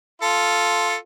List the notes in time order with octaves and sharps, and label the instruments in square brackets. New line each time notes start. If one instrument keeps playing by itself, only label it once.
[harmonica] F4 A4